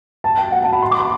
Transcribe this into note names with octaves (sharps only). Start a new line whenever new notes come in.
A5
G5
F#5
A5
B5
C6
D6
C6